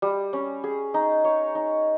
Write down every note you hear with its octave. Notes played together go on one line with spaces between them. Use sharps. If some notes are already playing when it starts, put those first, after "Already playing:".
G3
C#4
G#4
D#4
C#5
D#4